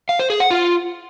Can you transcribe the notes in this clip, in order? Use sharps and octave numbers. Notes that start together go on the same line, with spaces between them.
F5
C5
G#4
F#5
F4